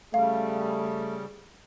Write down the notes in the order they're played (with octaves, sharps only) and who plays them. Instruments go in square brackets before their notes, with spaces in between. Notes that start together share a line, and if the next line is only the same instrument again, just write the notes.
[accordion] C#3 G3 [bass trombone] A3 [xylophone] F5